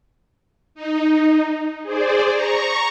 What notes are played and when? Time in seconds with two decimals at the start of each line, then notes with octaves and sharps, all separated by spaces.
0.75 D#4
1.83 G#4 C5 D5
2.32 A#5 C#6